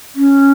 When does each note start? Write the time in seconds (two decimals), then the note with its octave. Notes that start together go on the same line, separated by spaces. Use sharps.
0.16 C#4